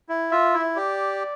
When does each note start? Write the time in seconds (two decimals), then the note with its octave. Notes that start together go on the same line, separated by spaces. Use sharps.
0.09 E4
0.32 F4 E5
0.54 E4
0.76 G4 D5